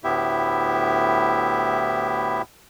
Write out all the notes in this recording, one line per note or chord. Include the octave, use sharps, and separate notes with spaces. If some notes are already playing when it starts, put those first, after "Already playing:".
D2 A2 B3 E4 G4 E5